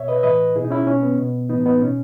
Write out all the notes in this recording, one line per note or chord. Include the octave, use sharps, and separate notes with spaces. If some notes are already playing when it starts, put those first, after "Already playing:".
Already playing: B2 C#5 E5
B4 D#5
E5
A2 E3 B4 D#5
B2 E4 G#4
D#4
C#4 E4
B2 C#4
B3
B2
A2 E3 B3 D#4
B3 D#4
B2 C#4